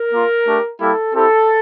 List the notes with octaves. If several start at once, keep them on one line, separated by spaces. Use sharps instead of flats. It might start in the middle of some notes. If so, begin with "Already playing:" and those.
Already playing: A#4
A#3 F4
A3 D4 G4
G3 A#3 E4 G4 A4
C4 E4 G4 A4